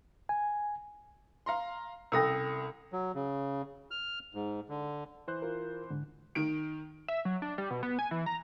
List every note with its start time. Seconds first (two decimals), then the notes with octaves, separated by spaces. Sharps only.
0.29 G#5
1.46 F5 A#5 C6
2.12 C2 C#4 A4 D#6 E6 A#6
2.93 F#3
3.14 C#3
3.91 F6
4.34 G#2
4.69 D3
5.28 E3 C5 F#6
5.42 F4 A#4
5.90 C#2 G#2 D3
6.35 D#3 D7
7.08 E5
7.25 F#3
7.42 D4
7.58 G3
7.70 B2
7.83 B3
7.99 G#5
8.11 E3
8.26 A#5